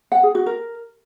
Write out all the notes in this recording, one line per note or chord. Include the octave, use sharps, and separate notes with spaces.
F#5
G#4
F#4
A#4